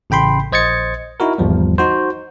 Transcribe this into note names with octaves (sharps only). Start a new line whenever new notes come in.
A1 C#3 G5 B5 C6
A#1 C5 D#5 G#6 A6 C#7
D#4 E4 F#4 A#4
G#1 E2 F3 G3
D#4 F#4 C5